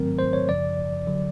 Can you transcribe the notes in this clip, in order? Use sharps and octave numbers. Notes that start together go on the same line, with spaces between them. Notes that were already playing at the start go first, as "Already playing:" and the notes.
Already playing: G#2 D#3 F#3 A3 C4 A#4
C5
C#5
F#2 C#3 F3 D5
D3 F#3